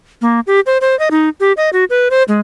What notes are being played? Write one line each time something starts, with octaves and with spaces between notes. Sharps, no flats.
A#3
G4
C5
C5
D#5
D#4
G4
D#5
F#4
B4
C5
G#3